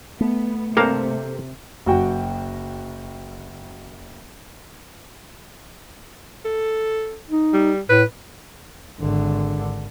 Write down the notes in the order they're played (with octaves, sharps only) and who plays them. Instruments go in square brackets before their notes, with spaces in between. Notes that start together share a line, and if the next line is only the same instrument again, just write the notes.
[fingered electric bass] A3 [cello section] B3
[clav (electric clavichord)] G2 A#3 F5 [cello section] C3 [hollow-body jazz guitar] A4 A#4 C5
[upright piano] F#1 F#4 G5
[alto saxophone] A4
[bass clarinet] D#4
[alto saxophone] G3
[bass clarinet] A2 [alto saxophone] B4
[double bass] G#1 D3